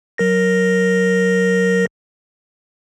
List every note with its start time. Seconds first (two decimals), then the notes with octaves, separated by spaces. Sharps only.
0.18 F#3 A#4 A#6